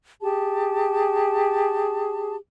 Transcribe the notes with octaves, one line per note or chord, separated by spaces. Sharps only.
G4 G#4 A5